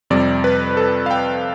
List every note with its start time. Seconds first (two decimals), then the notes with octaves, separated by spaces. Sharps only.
0.10 F2 C3 G3 D5
0.44 B4
0.77 A4
1.06 F5
1.11 G5